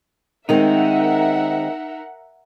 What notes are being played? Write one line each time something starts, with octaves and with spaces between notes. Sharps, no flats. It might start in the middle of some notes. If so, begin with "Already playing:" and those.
D#3 G#3 C4 D#4 A#4 E5 F#5